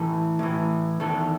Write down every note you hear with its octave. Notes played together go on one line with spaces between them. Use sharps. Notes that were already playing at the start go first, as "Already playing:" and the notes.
Already playing: A2 E3 A4
A2 E3
E2 D#3 A4